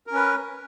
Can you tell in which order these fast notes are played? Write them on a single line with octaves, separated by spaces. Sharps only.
A#4 C#4 B4